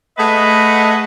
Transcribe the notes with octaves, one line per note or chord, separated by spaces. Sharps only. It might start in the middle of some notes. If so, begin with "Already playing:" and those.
A3 G#4 B4 D#5 F#5